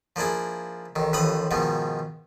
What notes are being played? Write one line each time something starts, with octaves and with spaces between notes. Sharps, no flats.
F3 A#3 D4 E4 G#4
A1 D#3
A1 D#2 F3 B4 B5 D#6
G#2 B2 D#3 F3